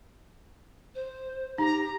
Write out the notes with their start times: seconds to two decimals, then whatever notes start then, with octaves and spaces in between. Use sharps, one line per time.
0.95 C5
1.58 D#4 G4 A#5